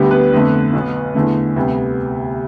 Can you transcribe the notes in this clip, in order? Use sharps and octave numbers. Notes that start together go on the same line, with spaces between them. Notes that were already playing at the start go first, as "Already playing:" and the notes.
Already playing: D2 D3 G3 B3 G4
B3 B4
F2 D3 A3
B1 B2 B3
E2 D3 A3
D2 C3 G3 B3